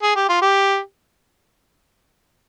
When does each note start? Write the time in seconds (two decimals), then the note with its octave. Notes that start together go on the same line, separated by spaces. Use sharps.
0.02 G#4
0.16 G4
0.29 F4
0.42 G4